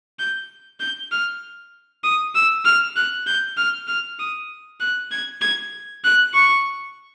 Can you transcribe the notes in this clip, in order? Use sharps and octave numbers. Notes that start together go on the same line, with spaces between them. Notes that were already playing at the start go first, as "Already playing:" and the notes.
G6
G6
F6
D#6
E6
F6
F#6
G6
F6
F6
D#6
F#6
G#6
G#6
F#6
C#6